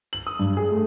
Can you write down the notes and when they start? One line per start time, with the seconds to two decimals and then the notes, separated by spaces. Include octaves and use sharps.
0.13 F#7
0.27 D#6
0.39 G2
0.57 G#4
0.70 A3